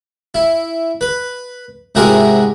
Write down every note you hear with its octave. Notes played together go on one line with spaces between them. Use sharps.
E4
B4
G#2 C3 E4 F#4 G#4 A#4